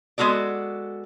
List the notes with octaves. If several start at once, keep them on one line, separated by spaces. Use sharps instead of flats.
G#3 B3 F#4 A4 D5